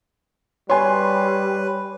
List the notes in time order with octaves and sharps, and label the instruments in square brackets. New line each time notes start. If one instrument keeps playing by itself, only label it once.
[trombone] G3 [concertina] B4 [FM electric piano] C#5 [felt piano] G#5 C6